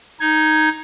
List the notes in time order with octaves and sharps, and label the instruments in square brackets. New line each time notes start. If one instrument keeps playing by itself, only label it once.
[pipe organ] D#4 G#6